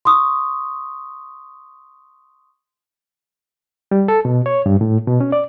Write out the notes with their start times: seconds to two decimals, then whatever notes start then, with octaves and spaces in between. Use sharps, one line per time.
0.05 C6 C#6 D#6
3.91 G3
4.08 A4
4.25 B2
4.46 C#5
4.66 G2
4.81 A2
5.07 B2
5.20 C#4
5.32 D5